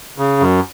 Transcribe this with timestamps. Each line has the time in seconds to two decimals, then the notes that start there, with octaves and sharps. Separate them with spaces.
0.18 C#3
0.40 F#2